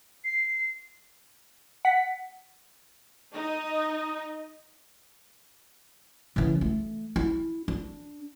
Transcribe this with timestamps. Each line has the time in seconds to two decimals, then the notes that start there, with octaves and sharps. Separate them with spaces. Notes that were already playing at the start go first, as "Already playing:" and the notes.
0.24 C7
1.85 F#5 B6
3.33 D#4 D#5
6.36 C#3 E3
6.61 A3
7.16 E4
7.68 D4